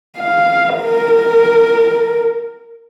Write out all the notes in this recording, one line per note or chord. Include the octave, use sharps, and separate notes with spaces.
F5
A#4